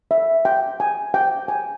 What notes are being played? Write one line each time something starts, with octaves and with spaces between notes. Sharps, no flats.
E5
G5
G#5
G5
G#5